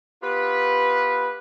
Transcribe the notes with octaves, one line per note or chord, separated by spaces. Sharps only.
B3 F4 G4 B4